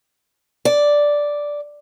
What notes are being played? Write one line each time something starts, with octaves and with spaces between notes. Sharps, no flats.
D5